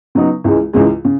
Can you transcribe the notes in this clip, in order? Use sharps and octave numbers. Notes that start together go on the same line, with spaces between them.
C#3 F#3 B3 D#4
C#2 C#3 E3 G#3
C#2 C#3 E3 G#3
C#3